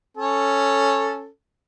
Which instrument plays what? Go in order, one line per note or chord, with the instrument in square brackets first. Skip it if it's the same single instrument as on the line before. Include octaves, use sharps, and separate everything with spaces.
[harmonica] C#4 A4